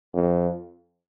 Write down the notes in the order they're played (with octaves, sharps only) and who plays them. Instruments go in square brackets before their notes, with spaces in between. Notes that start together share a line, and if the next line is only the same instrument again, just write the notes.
[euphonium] F2